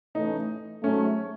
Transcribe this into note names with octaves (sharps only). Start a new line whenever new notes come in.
A2 E3 A3 C#4 D#4
G#2 F#3 A3 C#4